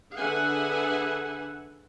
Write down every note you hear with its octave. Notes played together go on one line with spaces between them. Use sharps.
D3 G#4 B4 E5 F#5 G#5